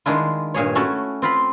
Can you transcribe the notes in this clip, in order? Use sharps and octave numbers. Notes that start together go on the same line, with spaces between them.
D#3 G#3 D4 E4 F4
G2 A#2 G#4 C#5
A3 C#4 E4 F#4 A4
C4 F4 B5